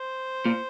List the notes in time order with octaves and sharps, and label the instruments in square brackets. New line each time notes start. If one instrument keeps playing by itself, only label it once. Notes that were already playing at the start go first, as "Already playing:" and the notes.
Already playing: [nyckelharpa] C5
[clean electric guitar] A#2